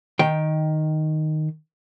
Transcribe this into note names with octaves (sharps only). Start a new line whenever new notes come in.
D#3 G5